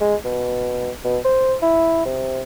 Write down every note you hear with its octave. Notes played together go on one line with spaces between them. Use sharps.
G#3
B2
B2
C5
E4
C3